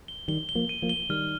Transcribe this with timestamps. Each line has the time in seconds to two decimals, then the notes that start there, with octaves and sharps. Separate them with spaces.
0.08 G7
0.28 D#3 G3 G7
0.49 G7
0.55 F3 A#3
0.69 D#7
0.82 F3 A#3
0.89 G7
1.09 D#3 G3 F6